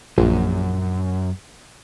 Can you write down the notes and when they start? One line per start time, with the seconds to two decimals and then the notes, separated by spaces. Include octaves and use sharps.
0.18 A#1 F#2